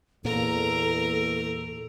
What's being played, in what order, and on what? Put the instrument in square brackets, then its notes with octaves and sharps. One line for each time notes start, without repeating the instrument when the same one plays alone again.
[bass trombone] E2 [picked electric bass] A#2 A#3 [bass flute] A4 [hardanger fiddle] A#4 A#5